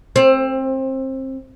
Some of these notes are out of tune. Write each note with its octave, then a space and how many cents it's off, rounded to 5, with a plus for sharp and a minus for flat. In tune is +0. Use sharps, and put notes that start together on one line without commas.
C4 +25